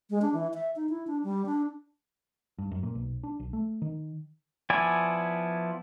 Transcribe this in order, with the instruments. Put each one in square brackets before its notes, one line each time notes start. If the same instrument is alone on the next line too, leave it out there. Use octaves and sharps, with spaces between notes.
[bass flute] G#3
D4
E3
E5
D#4
E4
D4
G3
D4
[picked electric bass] G2
F#2
A#2
B1
D4
B1
A3
D#3
[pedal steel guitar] F3 B3 E4 D5 G#5